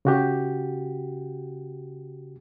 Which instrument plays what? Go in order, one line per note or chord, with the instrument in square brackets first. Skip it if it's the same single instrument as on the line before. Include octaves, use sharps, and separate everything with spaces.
[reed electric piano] C#3 F#4 G4